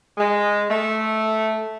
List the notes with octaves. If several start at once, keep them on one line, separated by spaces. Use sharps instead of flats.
G#3
A3